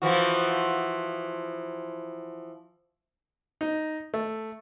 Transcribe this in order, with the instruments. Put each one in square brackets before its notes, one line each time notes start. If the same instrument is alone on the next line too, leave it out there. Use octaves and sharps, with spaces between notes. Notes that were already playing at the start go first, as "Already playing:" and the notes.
[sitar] E3 F3 F#4
[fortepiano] D#4
A3